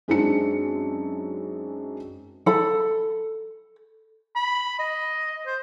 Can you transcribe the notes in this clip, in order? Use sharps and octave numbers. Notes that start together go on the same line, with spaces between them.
F#2 G#3 C4 D4 D#4 C#7
A4 B5
B5
D#5
C5